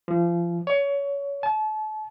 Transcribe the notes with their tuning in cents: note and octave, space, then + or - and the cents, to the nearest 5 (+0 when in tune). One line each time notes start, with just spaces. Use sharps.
F3 -30
C#5 +25
A5 -35